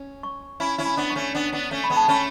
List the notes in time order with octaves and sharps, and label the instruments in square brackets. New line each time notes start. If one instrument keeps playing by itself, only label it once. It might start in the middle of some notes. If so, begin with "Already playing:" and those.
Already playing: [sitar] C#4
[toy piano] C#6
[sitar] C#4 E4 [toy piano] B5
[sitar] C#4 E4
[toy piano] B5
[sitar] B3 D4
[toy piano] C#6
[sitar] A3 C#4
B3 D4
B3 D4
A3 C#4
[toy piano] B5
[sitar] G#3 B3
[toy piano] A5
[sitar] A3 C#4 [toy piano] B5